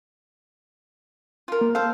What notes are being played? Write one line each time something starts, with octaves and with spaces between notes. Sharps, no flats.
F4 A#4
A#3
A4 C5 F5